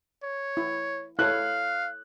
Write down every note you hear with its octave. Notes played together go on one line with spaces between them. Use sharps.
C#5
E4
E4 A4 C#5 F5 F#6